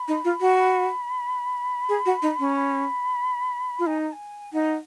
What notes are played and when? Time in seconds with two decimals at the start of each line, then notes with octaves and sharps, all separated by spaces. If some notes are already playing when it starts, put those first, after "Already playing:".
Already playing: B5
0.08 D#4
0.25 F4
0.41 F#4
0.57 B5
1.89 G#4
2.06 F#4
2.22 D#4
2.39 C#4
2.55 B5
3.79 F4
3.86 D#4 G#5
3.97 A#5
4.08 A#5
4.12 G#5
4.53 D#4 F#5